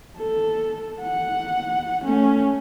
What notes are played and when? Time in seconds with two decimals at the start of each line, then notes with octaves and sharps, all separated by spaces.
0.18 A4
1.01 F#5
2.04 A3 C#4